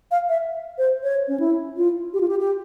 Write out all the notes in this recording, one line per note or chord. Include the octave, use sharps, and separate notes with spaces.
F5
E5
C5
C#5
C#4
E4
F4
G4
F4
G4
G4